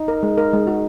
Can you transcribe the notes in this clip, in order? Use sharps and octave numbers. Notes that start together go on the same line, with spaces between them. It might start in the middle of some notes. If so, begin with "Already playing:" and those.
Already playing: D#4
A#4
G#3
A#4
G#3
F#4